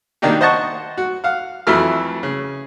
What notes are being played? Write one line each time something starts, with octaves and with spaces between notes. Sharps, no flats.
B2 D#3 A#3 D4 D#4 G4
C5 D#5 F#5 A5 C#6
F#4
F5 F#5
F2 E3 F#3 A3 E4 F6
C#3